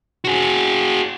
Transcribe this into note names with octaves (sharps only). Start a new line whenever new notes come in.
F#4 G#4